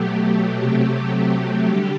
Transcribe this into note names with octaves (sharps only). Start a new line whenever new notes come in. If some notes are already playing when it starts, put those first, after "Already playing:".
Already playing: B2 F#3 A3 G4
C3 F#3 A3 G4
D3 G3 G4